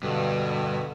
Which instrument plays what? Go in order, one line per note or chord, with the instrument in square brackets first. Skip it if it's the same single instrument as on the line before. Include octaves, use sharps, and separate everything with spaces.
[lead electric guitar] G2 [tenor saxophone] B2 [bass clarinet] D3